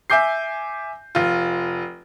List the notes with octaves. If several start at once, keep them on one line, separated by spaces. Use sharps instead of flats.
E5 G#5 D6 G6 C7
F1 F4